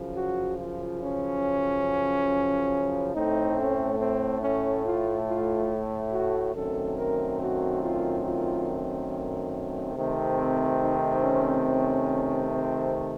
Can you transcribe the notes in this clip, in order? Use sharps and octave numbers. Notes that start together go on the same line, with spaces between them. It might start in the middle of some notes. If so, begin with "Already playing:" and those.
Already playing: F#2 C#3 F3
F#4
F4
C#4
A2 A3 C4 D#4
C#4
C4
C#4
F4
F4
F#4
F#2 D#3 A3 C4 A4
A#4
F#4
F4
F4
C3 D#3 A3 C4
D#4
C#4
C#4
C4